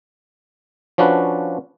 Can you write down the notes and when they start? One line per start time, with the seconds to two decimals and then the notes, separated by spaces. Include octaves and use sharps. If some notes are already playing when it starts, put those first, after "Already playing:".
0.98 F3 C#4 D4 F#4 B4